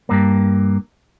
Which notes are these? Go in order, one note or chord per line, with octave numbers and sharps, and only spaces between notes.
G2 A#3